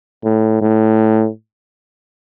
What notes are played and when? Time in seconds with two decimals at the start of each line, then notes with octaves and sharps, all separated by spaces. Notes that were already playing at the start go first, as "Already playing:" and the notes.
0.24 A2
0.61 A2